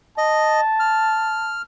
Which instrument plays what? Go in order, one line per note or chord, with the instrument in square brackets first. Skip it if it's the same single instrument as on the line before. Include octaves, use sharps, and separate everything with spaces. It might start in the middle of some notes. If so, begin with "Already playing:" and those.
[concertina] D#5 [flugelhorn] A5
[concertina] F6